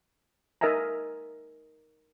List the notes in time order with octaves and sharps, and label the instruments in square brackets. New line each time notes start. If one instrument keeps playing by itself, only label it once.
[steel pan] D#4 A#4 D#5 E5 G#5 A#5